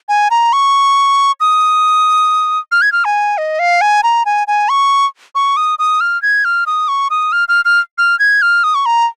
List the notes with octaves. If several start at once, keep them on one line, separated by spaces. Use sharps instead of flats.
G#5
A#5
C#6
D#6
F6
G#6
F6
G#5
D#5
F5
G#5
A#5
G#5
G#5
C#6
C#6
D#6
D#6
F6
G#6
F6
D#6
C#6
D#6
F6
F6
F6
F6
G#6
F6
D#6
C#6
A#5